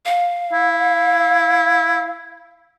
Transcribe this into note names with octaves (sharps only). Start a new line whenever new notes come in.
F5
E4